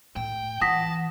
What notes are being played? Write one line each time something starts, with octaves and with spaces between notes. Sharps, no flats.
A2 G5
E3 F#5 A5 D#6 A#6 B6